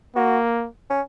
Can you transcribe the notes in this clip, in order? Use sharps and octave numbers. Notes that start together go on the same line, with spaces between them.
A#3 F#4
C#4